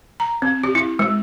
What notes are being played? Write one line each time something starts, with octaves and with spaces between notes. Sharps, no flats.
A#5
C4
G4
E4
G#3